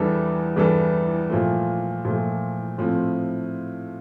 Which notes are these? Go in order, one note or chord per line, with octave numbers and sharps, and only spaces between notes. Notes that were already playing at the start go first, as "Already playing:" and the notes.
Already playing: E2 E3 G3 D4 A4
E2 E3 G3 D4 A4
A#2 F3 A3
A#2 F3 A3
A2 F3 A3 C4